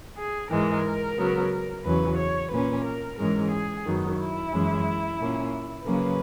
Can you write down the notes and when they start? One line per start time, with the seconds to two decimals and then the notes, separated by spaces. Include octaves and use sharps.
0.17 G#4
0.50 G#2 E3 G#3 A#4
1.17 C#3 F#3 B3
1.84 E2 C#3 F#3 C#4 B4
2.18 C#5
2.51 A#2 A#3 C#4 B4
2.84 A#4
3.18 G#2 E3 G#3 C#4 A#4
3.51 G#4
3.85 F#2 D#3 F#3 B3
4.18 E4
4.52 F#2 E3 G#3 C#4
5.19 A#2 A#3 C#4
5.85 C#3 F#3 A#3 C#4 B4